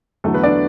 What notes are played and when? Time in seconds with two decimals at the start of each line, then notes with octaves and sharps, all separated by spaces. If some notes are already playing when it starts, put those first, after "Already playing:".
0.24 E2 D3 F#3 A3 A4
0.34 B3 B4
0.43 D4 D5